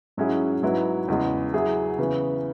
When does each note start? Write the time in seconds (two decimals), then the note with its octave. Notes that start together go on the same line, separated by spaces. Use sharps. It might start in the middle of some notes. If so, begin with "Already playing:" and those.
0.17 G#2 F#3 C#4 E4 G#4
0.63 G#2 F#3 E4 B4
1.08 E2 C#3 G#3
1.53 F#3 E4 G#4 E5
1.98 C#3 E3 B3